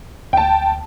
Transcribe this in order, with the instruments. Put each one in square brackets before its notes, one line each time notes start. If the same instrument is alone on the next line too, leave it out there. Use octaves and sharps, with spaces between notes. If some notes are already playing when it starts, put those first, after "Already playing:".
[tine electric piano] D2 [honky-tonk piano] G5 A5